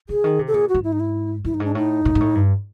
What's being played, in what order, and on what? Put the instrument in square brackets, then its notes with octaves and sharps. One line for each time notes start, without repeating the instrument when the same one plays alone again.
[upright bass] D3 [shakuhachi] G#4
[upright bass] D#3
C3
[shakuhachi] A4
[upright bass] A#2 [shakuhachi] G#4
[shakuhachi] F#4
[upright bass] G#2
[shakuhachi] E4
D#4
E4
[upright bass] G2 [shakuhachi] E4
[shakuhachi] D#4
[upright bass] G#2 [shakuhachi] D4
[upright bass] A2 [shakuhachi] D#4
[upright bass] A2
G#2
A2
G2